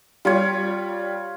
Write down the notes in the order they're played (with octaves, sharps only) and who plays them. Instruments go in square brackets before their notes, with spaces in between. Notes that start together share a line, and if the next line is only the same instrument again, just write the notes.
[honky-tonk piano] G3 [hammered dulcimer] F4 C#5